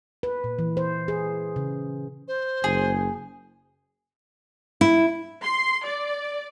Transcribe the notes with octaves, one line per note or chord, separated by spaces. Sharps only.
B4
A#2
E3
C5
G#4
C#3
C5
F#1 G#4
E4
C6
D5